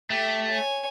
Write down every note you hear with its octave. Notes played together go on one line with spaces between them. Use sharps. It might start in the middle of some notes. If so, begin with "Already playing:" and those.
A3 G4 E5
C#5 G#5